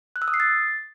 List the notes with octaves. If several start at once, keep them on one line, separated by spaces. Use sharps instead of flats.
F#6
E6
D#6
C7
A6